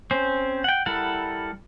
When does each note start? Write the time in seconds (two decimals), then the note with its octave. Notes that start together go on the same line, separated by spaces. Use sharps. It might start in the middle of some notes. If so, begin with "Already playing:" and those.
0.11 C4 C#4 C5
0.64 F#5 G5
0.86 G3 E4 A4 A#4 F#5